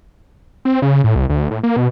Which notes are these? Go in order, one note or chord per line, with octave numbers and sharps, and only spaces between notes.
C4
C#3
A2
C2
D2
A2
A#3
B2